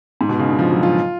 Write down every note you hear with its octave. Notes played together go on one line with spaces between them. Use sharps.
G#2
B2
C#3
D3
F3
F#3
F4